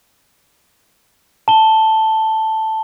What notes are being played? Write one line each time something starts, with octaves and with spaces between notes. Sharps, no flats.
A5 G7